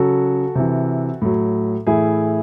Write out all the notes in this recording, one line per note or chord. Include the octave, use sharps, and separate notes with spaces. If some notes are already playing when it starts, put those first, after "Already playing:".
Already playing: C#3 F#3 F#4 A4
C3 E3
A2 F#3
A2 E3 E4 G#4